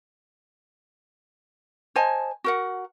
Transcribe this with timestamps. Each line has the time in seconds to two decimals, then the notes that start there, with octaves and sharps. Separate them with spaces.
1.96 C5 D#5 G#5 A5
2.44 F#4 A#4 F#5